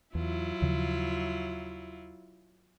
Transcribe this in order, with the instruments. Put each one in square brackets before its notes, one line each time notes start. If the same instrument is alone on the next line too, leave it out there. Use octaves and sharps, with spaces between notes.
[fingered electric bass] E2 [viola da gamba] F#3 E4 F4
[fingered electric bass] D#2 C#3 F3